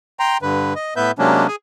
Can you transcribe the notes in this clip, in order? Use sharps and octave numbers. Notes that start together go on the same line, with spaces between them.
G5 A#5 C6
G2 D3 B4
D#5
A2 B3 B4 E5 G6
C3 F#3 G#3 A#3 C#4 D4
G#4 G#5